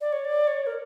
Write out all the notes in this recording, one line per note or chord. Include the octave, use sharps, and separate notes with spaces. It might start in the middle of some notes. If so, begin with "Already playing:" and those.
D5
C#5
D5
C#5
A#4